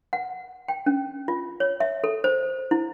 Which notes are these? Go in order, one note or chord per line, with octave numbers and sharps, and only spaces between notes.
F#5
G5
C#4
F4
C#5
E5
A4
C5
E4